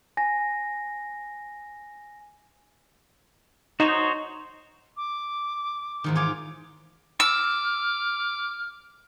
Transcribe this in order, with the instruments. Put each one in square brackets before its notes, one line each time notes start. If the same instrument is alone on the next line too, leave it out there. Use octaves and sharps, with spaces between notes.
[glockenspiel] G#5 A#6
[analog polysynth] D#4 [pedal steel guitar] F#4 C5 C#5
[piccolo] D6
[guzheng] E2 G#2 D#3
[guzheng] F4 C#5 G#5 [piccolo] D6
[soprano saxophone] D6 [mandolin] E6 [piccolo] F6